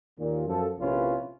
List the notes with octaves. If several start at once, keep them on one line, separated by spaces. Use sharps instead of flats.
D#2 A#2
F#2 F3 A4
A#1 C3 C#4 E4 F4 B4